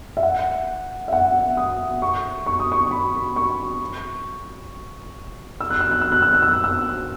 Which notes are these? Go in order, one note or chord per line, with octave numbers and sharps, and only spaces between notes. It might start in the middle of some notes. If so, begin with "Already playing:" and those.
E5
F#5
E5
F#5
D#6
C#6
C#6
D#6
C#6
B5
C#6
E6
F#6
E6
F#6
E6
F#6
E6
F#6
E6
F#6
E6